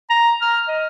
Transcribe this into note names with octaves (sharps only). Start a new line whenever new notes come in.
A#5
F6
D#5